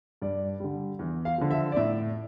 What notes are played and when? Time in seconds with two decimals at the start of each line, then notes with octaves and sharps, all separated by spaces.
0.22 G2 D5
0.60 D3 G3
0.99 E2
1.25 F5
1.38 D3 F3
1.51 E5
1.72 D5
1.76 A2 E5